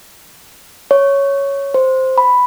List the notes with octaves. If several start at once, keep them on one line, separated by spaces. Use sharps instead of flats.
C#5
C5
B5